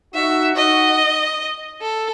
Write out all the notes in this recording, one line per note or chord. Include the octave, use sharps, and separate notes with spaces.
D#4 F#4 E5
D#4 F#4 D#5
A4